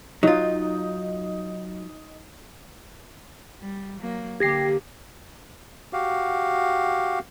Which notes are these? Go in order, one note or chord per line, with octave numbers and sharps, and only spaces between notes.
F#3 D#4 F4
G3
F#3 A#3
D3 A#3 G4 G#6 A#6 C7
F#4 G4 F5